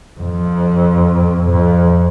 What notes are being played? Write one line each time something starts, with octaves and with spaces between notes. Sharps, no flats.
F2
F2